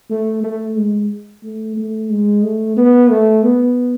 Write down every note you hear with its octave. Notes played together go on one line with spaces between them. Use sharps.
A3
A3
G#3
A3
A3
G#3
A3
B3
A3
B3